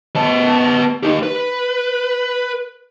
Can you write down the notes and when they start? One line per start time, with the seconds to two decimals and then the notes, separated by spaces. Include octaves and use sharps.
0.16 B3 A5
1.03 D#4 G4
1.23 B4